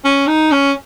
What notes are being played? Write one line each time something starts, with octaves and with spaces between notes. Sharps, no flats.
C#4
D#4
C#4